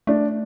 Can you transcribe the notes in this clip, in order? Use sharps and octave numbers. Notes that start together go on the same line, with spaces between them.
A3 D4